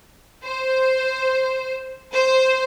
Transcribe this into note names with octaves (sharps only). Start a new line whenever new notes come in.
C5
C5